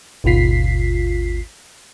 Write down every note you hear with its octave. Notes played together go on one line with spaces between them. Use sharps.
G#1 D#2 B2 F4 B6 C7